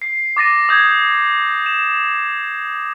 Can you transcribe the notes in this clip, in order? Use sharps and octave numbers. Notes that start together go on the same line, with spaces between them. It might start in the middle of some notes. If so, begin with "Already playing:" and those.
C7
D6 A6 A#6 D#7
D#6 G6 G#6 A#6
E7